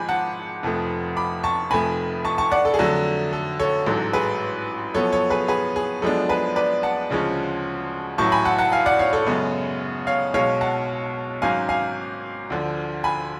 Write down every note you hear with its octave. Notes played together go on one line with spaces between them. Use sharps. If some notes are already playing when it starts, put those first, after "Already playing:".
Already playing: G#1 G#2 F3 G#3 G#5 B5
F#5 A5
F1 F2 F3 A3
B5 D6
A5 C#6
F1 F2 F3 A3 G#5 B5
A5 C#6
A5 C#6
D5 F#5
A4
G#4
F2 D3 F#3 A3 A4
A4
A4 C#5
A1 G#2 F#3 A4
G#4 B4
F#2 F3 B3 A4 C#5
A4 C#5
G#4 B4
G#4 B4
G#4
F#2 F3 G#3 B3 D4 A4
G#4 B4
B4 D5
F#5 A5
D2 C#3 F3 G#3 C#4
A1 A2 F#3 A5 C#6
G#5 B5
F#5 A5
F#5 A5
F5 G#5
D5 F#5
C#5 F5
A4 C#5
F#2 C#3 G#3 B3
C#5 F5
B1 B2 G#3 C#5 F5
F#5 A5
G#1 G#2 F#3 C#4 F5 G#5
F5 G#5
D2 D3 F3
G#5 B5